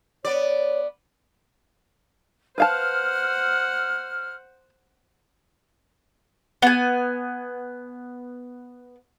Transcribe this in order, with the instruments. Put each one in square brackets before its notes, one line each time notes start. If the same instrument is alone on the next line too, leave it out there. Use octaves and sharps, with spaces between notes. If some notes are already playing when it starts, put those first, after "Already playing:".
[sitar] B3 D5 [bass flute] C#5
[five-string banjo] B4 F5 A5 [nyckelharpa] C5 F#5 [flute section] F6
[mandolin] B3 G#5